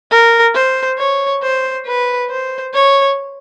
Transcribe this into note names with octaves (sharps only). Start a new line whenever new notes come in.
A#4
C5
C#5
C5
B4
C5
C#5